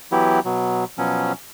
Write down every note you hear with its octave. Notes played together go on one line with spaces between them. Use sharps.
E3 F#3 B3 E4 G4
B2 F#3
B2 F3 F#3 C#4